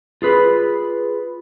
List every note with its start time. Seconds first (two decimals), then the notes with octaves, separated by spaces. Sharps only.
0.22 F4 G#4 B4